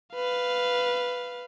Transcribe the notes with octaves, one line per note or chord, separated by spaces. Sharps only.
B4 F5